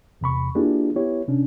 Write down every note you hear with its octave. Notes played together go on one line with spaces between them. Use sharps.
E2 C3 B5 C#6
A#3 D4 E4 F4 G4 G#4
B3 E4 G4 C#5
C3 C#4 D4